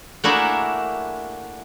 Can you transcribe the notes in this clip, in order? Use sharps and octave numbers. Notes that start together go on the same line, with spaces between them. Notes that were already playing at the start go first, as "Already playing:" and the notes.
A3 A#3 D4 E4 F#4 G#4